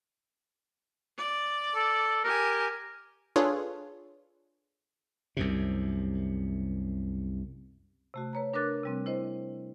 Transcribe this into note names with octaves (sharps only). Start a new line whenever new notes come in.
D5
A4
G4 A#4 G#5
D4 F4 G#4 A4 B4 C#5
C2 F#2 C3
C3 A3 F#4
B4 C#5 A#5
D4 A#4 B4 D6 F#6 A6
C3 G3 C4
E4 C5 D#5